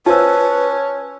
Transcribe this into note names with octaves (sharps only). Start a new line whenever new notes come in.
C#4 F4 B4 C5 G#5 A5 E6